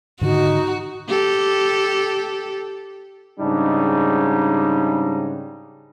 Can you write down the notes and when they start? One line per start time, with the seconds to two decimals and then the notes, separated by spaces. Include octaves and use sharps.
0.21 G#2 D3 D#3 D#4 F#4
1.08 G4 A4
3.39 G#2 C#3 G3 D4 D#4